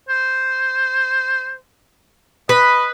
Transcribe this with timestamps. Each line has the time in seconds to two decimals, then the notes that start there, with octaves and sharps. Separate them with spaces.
0.09 C5
2.49 B4 D#5